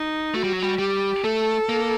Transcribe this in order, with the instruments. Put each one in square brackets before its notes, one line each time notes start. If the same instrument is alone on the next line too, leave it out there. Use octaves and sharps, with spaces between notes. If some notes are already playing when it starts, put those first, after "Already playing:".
Already playing: [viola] D#4
[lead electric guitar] A3 [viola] F#4
[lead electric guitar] G3
F#3
G3
[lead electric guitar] G3 [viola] G4
[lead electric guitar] A3 [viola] A4
[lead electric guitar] A#3